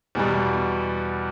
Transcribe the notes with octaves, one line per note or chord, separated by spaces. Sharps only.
E2 B2 G3